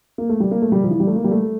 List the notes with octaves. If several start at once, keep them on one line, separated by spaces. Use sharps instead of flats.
A#3
A3
G3
A#3
A3
G3
F3
E3
G3
A3
A#3
G3
A3